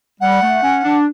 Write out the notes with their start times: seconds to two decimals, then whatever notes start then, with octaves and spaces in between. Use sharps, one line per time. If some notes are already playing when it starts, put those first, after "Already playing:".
0.21 G3 F#5
0.42 A3
0.63 C#4
0.84 D4